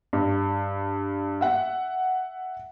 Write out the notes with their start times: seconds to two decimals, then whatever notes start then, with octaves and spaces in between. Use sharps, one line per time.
0.13 G2
1.41 E5 F#5